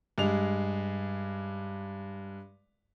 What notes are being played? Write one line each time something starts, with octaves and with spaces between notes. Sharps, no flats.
G2 G#3 F7